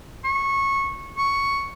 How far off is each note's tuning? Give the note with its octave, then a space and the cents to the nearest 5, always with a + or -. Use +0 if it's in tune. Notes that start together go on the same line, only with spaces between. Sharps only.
C#6 -20
C#6 +0